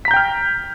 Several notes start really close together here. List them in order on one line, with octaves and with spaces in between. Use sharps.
B6 A#5 G6 G5 F6